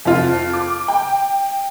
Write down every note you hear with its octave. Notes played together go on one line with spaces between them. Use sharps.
F2 F4
D6
G5